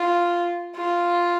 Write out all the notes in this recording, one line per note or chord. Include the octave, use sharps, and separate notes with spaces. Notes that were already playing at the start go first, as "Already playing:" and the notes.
Already playing: F4
F4